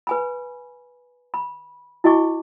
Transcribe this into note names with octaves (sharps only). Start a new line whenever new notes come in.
B4 G#5 B5
B5
E4 F#4 D#5 G#5 C#6 D6